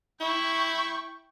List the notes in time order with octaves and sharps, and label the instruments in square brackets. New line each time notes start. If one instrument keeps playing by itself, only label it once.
[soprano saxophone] E4 [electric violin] G5 C#6